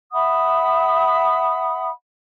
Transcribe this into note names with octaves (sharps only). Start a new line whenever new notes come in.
E5 F#5 B5 D#6